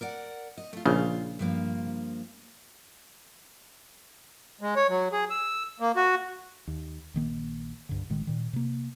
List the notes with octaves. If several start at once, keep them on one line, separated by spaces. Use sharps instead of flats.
A#4 D5 F#5
D#5
A3 F4
A#1 C#3 F4
G2 F3 A#3
G#3
C#5
F#3
G#4
E6
A#3
F#4
D#2
A#1 D#3 A#3
C2 G2 D3
A1 A2 D#3 G#3
A#2 D#3
C3 A#3